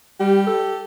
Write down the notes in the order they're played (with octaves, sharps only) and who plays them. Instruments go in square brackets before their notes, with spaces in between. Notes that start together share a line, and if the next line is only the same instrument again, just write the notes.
[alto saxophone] G3 [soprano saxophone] G4
[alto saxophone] A4